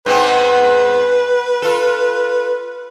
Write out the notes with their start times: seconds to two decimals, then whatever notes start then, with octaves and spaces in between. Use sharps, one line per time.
0.06 G#2 B3 C4 B4
1.62 F4 A4